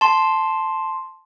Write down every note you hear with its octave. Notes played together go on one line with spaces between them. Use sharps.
A5 C6